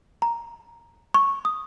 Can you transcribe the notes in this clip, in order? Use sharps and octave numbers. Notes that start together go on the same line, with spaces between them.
A#5
C#6
D#6